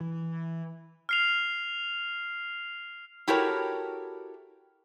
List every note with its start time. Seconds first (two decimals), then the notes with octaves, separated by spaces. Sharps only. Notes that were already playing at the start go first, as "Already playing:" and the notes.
0.01 E3
1.09 F6 C7 F7
3.28 E4 F#4 G4 A4 A#4 C#5